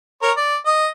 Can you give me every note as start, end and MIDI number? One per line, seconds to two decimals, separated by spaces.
0.22 0.31 70
0.22 0.31 73
0.37 0.56 74
0.66 0.87 75